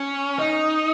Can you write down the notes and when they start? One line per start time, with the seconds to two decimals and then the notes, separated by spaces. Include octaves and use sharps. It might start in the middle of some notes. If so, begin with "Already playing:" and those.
Already playing: C#4
0.39 D#4